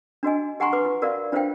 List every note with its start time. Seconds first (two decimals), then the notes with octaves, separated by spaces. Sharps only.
0.23 D4 F#4 D#5 G#5
0.60 G4 F#5 G#5 A#5 C6 C#6
0.73 B4 D6
0.85 F4
1.02 F#4 A#4 D5 E5 F5
1.32 D4 F4 C5 E5 F5 G5